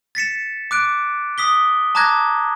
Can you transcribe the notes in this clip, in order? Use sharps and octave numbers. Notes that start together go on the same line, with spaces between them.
A6 B6 C#7 E7
D6 F#6 D7
D#6 B6 G7
A5 A#5 D6 F#6 G#6 A#6